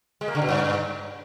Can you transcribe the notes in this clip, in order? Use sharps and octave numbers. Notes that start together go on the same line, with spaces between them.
G#3
A#3
D3
B2
G2